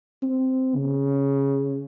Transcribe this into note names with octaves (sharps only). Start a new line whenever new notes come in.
C4
C#3